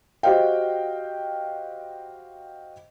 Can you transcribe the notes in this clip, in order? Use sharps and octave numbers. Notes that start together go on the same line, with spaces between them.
F#4 G4 C5 D#5 F5 G5